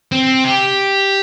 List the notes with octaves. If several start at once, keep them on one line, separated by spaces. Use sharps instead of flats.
C4
G4